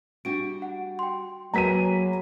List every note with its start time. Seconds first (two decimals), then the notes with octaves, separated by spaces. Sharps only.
0.25 G3 D4 F#4 D7
0.62 F#5
0.99 G5 C6
1.54 F#3 A#3 G#4 B4 A#5 B6 D#7